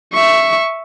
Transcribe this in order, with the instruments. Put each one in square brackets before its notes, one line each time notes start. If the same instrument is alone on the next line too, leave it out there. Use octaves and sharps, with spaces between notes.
[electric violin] E5 C#6